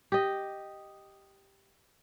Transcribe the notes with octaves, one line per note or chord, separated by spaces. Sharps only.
G4 D#5